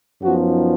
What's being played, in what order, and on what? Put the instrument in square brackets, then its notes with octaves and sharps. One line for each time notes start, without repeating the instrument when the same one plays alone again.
[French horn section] F#2 F3 B3 D#4 F#4